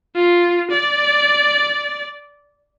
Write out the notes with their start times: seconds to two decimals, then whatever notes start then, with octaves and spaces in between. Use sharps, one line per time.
0.16 F4
0.71 D5